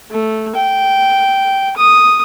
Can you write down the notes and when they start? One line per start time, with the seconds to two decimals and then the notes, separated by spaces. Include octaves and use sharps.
0.11 A3
0.56 G5
1.77 D#6